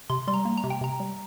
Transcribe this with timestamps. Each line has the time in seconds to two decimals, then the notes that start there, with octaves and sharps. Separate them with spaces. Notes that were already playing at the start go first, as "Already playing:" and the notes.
0.10 C3 C6
0.28 G3 C6
0.34 A#5
0.45 A#3
0.58 A#5
0.64 C3
0.70 G5
0.81 C3 A#5
1.00 G3